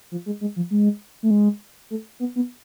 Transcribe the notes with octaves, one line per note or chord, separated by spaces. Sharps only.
F3
G#3
G#3
F3
G#3
A3
G#3
A3
B3
B3